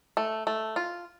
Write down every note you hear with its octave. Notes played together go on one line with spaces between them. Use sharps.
A3
A3
F4